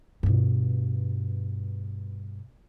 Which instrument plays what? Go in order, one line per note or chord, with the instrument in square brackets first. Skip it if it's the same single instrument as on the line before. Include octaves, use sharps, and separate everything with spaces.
[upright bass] G2 B2